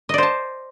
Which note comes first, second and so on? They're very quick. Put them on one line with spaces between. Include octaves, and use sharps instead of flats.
D#5 D5 C5 A5